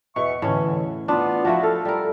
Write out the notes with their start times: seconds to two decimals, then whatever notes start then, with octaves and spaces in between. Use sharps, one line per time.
0.16 E2 B2 E5 C#6
0.42 E2 A2 D3 E3 C#4
1.08 B3 D4 F4
1.45 F3 A3 E4 F#4
1.63 A4 F5
1.85 G3 A#4